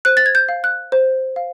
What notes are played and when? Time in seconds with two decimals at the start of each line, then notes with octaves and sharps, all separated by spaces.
0.05 C5 F#6
0.17 A6
0.26 G#6
0.35 G6
0.49 F5
0.64 F#6
0.92 C5
1.36 F5